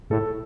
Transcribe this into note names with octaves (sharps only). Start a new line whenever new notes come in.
A2 A4